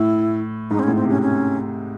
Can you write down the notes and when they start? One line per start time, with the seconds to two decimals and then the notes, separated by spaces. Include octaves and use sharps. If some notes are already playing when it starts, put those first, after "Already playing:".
Already playing: A2 E4
0.70 G#2 D#4
0.79 C4
0.83 C#4
0.88 A2
0.96 C4
1.05 C3 C#4
1.22 C#4